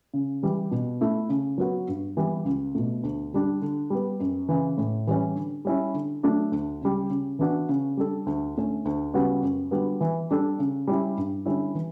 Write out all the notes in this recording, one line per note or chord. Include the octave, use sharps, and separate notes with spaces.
C#3
E3 G3
B2
A3 E4
C#3
F#3 B3 F#4 B4
G2
E3 G3 B3
C#2
B2 A3
D2
D3 G3 D4
D3
G3 B3
F#2
C#3 E3
A2
E3 G3 C#4
D3
G3 C#4 E4
D3
F#3 A3 D4
D2
C#3 G3
C#3
E3 B3 D4 F#4
C#3
G3 D4 A4
D2
D3 A3 C#4
D2
C#3 G3 B3 F#4
F#2
D3 G3 B3 F#4
E3
G3 D4 A4
C#3
G3 C#4 E4
G2
D3 G3 C#4 E4
E3